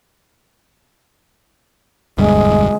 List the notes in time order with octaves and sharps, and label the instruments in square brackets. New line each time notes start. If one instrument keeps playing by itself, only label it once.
[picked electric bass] E1 D2 G2 [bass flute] G#3